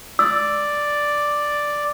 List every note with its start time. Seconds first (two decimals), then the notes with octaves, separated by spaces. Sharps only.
0.19 D5 E6